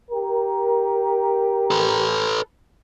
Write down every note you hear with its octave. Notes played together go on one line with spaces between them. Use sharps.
G4 A#4
A4 B4